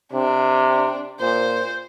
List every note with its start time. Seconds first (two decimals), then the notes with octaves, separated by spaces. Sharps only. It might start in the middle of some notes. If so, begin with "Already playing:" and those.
0.13 C3 D4
1.21 A#2 C5